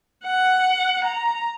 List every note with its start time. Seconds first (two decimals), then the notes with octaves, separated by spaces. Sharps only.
0.24 F#5
1.04 A#5